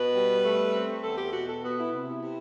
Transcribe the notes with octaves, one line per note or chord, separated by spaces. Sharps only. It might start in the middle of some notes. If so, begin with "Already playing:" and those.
Already playing: B2 B4
G3
A3
C4
E2 A4
G4
B2 F#4
A4
B3 F#4
E4
C3
E4
C3